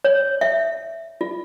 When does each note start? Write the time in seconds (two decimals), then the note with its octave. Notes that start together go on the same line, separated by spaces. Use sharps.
0.04 C#5
0.41 E5
1.21 F4